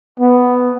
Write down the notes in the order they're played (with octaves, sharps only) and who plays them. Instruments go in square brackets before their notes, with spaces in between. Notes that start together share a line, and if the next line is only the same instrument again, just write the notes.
[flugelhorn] B3